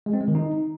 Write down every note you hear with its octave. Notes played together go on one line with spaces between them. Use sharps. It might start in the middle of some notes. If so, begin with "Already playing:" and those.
G#3
C4
G#3
D#3
D#4